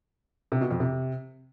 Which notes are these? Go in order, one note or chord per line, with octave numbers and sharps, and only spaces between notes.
C3
B2
F2
C3